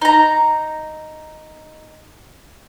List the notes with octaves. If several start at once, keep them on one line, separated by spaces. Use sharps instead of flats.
D#4 A#5